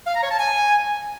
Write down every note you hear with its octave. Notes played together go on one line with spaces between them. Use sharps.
F5
A#5
C#5
A5
G#5